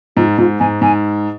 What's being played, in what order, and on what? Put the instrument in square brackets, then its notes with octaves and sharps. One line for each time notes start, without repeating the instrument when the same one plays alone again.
[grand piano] G#2 [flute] F4
[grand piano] G#2 [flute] F4
[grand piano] G#2 [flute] G#5
[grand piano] G#2 [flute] G#5